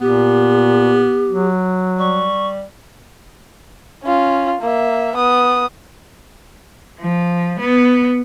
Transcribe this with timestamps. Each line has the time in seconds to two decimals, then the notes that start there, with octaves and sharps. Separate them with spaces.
0.01 A#2 B3 G4
1.28 F#3
1.99 G3 C#6
4.03 C#4 F4
4.61 A#3 E5
5.15 B3 D#6
7.00 F3
7.60 B3